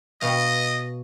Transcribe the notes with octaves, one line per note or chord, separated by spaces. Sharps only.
B2 D#5 F5 G5